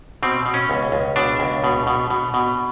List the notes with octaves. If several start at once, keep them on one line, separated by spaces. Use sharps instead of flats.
B2 C4
B2
C#4
C#2
C#2
B2 D4
C#2
B2
B2
B2
B2